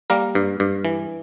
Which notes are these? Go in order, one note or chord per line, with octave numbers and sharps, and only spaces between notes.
G3 A#3 A#4
G2
G2
E3